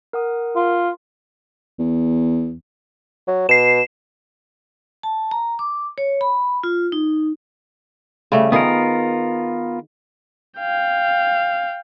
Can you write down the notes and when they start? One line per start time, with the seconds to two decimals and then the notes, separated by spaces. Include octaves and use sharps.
0.13 A#4 F#5 D#6
0.55 F4
1.79 E2
3.28 F#3
3.49 B2 C7 E7
5.03 A5
5.31 A#5
5.59 D6
5.98 C#5
6.21 B5
6.63 F4
6.92 D#4
8.32 C#3 G3 A3
8.52 D#3 B3 F4 G#4 A#4
10.59 F5 G5